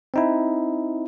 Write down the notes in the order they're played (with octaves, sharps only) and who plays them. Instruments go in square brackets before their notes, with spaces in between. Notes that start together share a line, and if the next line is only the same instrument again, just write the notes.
[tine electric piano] C4 D#4 E4